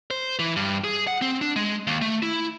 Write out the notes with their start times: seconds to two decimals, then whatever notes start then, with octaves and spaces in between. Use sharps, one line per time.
0.11 C5
0.39 E3
0.56 G2
0.84 G#4
1.07 F#5
1.22 C4
1.41 D4
1.56 G#3
1.87 D#2
2.02 A3
2.23 E4